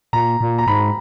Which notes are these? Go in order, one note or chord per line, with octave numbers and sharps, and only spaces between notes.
A#2 A#5
A#2
A#5
G#2 B5